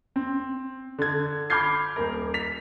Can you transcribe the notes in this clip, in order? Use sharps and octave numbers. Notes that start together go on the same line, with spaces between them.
C4
D3 G#6
B5 D6 F6 G6 G#6 C7
D#1 A#4
B6 F7